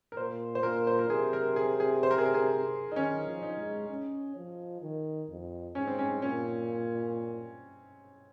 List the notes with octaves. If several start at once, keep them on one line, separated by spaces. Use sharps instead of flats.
A#4
A#2 C5
C5
A#2 A#4
C5
A#4
C3 G#4
A#4
G#4
G#4
C5
A#4
G#4
A#4
G#4
D#4
D#3 C#4
F3
D#4
G#3
C#4
F3
D#3
F2
G#2 C#4
C4
C#4
A#2 C#4